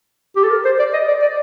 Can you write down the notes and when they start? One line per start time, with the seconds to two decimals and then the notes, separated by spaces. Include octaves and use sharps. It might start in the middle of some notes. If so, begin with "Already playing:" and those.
0.36 G4
0.44 A4
0.51 A#4
0.65 C5
0.79 D5
0.94 D#5
1.08 D5
1.22 D5